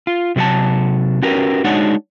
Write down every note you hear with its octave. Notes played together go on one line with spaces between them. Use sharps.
F4
C3 F#3 F#4 F#5 A5
C#4 F#4 G4 A#4 B4
G#3 D4 D#4 F#4 C#5 F#5